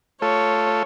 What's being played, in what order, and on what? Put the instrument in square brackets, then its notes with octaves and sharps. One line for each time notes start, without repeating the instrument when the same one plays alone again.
[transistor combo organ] A3 F4 A4 [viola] C#5